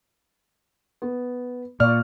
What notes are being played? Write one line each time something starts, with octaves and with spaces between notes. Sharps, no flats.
B3
A#2 D5 F5 C#6 F6